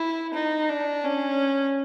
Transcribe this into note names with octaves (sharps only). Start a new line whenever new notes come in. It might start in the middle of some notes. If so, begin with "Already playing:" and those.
Already playing: E4
D#4
D4
C#4